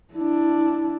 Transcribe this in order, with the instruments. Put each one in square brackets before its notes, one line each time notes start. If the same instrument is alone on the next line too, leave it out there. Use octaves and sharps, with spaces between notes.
[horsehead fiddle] D4 E4